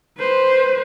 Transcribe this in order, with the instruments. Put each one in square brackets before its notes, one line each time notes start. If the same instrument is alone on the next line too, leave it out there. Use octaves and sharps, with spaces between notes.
[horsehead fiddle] B4 C5